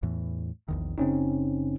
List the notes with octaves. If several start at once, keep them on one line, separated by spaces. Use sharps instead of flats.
E2 A2 E3
A#1 E2 D#3
F#1 C#3 C4 C#4 D#4